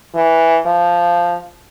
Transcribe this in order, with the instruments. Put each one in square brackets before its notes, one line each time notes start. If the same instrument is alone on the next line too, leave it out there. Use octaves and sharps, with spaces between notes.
[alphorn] E3
F3